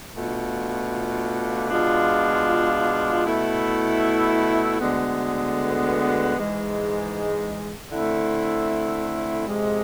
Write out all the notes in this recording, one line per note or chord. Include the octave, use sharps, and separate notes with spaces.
B2 A3 D4 F4
B2 G#3 D4 F4
B2 A3 E4
D2 D3 G#3 B3
G#2 E3 G#3
D3 A3 C4 E4
F2 C3 G#3